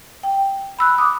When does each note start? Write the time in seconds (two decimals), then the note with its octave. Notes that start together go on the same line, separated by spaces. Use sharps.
0.23 G5
0.79 B5 E6 F#6
0.98 D6 D#6